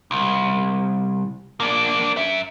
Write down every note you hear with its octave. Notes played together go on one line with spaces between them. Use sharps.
C2
A#3 D4
F#2 E5